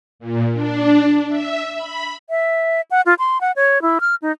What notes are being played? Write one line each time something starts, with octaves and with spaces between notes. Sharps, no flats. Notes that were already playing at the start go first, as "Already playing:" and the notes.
A#2
D4
E5
B5
E5
F#5
F4
C6
F#5
C#5
E4
F6
D#4